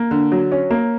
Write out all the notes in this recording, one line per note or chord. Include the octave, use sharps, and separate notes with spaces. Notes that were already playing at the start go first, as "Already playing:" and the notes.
Already playing: A#3
D3
F#3
C#4
A#3